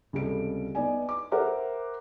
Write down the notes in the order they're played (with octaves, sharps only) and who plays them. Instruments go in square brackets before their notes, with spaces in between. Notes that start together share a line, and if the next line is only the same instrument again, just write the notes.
[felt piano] C#2 C3 G3 A4 D7
B3 D#4 D5 G#5
D6
A#4 C5 E5 F#5 A#5 D6